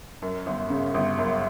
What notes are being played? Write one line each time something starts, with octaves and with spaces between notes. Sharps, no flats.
F#2
G1
C#3
G1
F#2